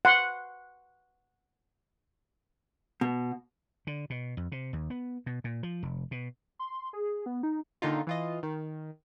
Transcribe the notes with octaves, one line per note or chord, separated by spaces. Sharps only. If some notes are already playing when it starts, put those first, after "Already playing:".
F#5 C6
B2
D3
B2
F2
C3
D#2
B3
B2
A#2
F3
F1
B2
C6
G#4
B3
D#4
A#2 D3 D#3 D#4 F4
E3 F4 D#5
D#3